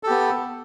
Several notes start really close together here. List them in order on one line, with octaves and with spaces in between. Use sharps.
A4 G4 B3